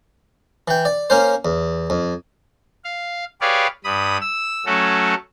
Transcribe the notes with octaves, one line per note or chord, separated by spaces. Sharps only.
E3 G5
D5
A#3 C#4 C5
E2
F2
F5
G4 G#4 B4 C#5 D5 F5
G2 B5 D#6
E6
F#3 A3 C#4 F#4 A4